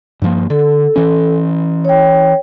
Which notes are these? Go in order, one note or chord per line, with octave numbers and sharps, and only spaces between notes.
G2 F3 A#3
D3 A4
E3 C#4
C#5 G5